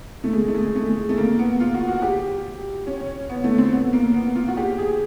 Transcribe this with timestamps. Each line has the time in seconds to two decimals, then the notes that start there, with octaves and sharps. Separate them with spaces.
0.24 A3
0.33 G#3
0.48 A3
0.54 G#3
0.75 A3
1.09 A3
1.18 A#3
1.39 B3
1.60 F4
1.74 F#4
1.88 F#4
2.02 G4
2.87 C#4
3.29 B3
3.44 A3
3.58 C4
3.72 B3
3.93 A#3
4.14 B3
4.35 F4
4.48 F#4
4.57 G4
4.78 G#4